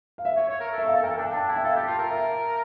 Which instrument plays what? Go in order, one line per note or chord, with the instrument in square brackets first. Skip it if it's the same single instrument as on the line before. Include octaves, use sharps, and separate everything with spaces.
[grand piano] F5
E5
[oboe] C#5
C#5
A#4
A4
[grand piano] E5
F5
[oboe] A4
[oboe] A#4 [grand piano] G5
[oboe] A4
[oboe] D4 [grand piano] G5
[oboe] D4 [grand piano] A5
[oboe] E4 [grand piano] G5
[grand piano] E5
[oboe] A4 [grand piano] F5
[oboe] G4
F4
A#4
[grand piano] E5